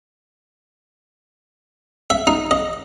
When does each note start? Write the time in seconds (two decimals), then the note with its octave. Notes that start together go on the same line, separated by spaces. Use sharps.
2.10 E5
2.27 D#4
2.51 D#5